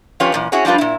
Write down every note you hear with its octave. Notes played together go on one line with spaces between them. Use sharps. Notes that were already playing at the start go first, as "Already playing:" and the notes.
F3 C#4 F4 G4 B4 C#5
F#2 A#2 E3
C#4 E4 F#4 G#4 C#5
F3 G3 D4 F4 B4
A#2 E4